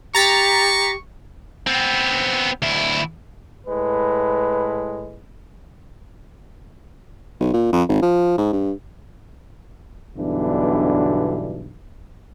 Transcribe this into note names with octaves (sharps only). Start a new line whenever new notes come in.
G4 A#5 C#6 A6 B6
B3 C4
D2 E4
A2 G#3 B4
B1
A#2
F2
G#1
F3
G#2
G2
B1 G2 B2 D3 E3 D4